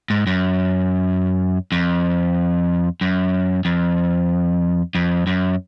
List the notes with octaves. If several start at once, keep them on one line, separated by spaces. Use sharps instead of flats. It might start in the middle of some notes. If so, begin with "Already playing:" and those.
G#2
F#2
F2
F#2
F2
F2
F#2